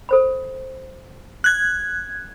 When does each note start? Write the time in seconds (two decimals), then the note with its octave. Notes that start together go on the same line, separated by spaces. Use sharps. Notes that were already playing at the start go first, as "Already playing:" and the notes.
0.09 A4 C5 B5
1.44 F#6 G#6